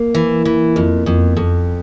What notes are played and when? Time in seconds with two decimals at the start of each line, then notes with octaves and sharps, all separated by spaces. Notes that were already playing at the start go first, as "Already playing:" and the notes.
Already playing: A#3
0.15 E3
0.45 E3
0.76 F2
1.06 F2
1.37 F2